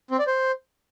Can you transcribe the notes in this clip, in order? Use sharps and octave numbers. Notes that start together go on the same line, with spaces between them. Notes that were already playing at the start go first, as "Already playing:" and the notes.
C4
D5
C5